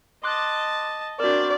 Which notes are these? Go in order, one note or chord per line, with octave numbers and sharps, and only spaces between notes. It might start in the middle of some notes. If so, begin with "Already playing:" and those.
D#5 A5 C6 D6 F#6
C4 D4 F#4 A#4 D5